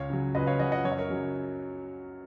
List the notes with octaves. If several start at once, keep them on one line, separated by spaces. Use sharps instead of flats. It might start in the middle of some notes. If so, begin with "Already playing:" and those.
Already playing: C#2 C#5 F5
C#3 F#3
C#2 B4 D#5
C#5 F5
C#3 F#3 D#5 F#5
D#5 F#5
F#2 C#5
D#5
A#4 C#5
C#3 F#3